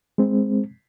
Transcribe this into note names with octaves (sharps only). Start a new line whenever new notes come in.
G#3 C4